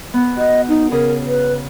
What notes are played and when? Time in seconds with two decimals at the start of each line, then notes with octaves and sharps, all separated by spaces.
0.14 B3
0.37 F#4 D#5
0.68 D#4
0.91 C#3 G#4 A#4
1.27 B4